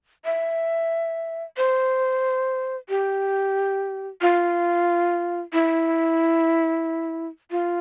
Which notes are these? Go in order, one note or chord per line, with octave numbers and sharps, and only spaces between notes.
E5
C5
G4
F4
E4
F4